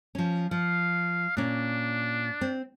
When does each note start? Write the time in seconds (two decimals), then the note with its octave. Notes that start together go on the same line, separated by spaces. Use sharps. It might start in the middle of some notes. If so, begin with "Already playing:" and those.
0.15 F3 C#4
0.51 F3 F5
1.37 A#2 C#4 D4
2.41 C4